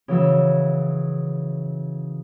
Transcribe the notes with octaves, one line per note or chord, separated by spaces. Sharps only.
C#3 E3 F#3 E6